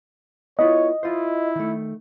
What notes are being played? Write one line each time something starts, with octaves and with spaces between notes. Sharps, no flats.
B3 E4 F4 C#5 D#5
E4 F4 C5
D#3 A3